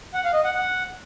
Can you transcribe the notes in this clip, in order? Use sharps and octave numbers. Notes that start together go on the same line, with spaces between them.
F#5
F5
D#5
F#5
F#5